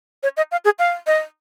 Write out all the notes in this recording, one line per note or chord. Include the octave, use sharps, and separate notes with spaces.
C#5
D#5
F5
G#4
F5
D#5